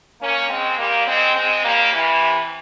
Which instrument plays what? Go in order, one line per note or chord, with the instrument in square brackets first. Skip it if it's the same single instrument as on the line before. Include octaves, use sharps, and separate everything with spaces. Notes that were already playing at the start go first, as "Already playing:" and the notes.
[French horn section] A#3 C#4
G#3 C4
G3 A#3
G#3 C4
G#3 C4
G3 A#3
C3 E3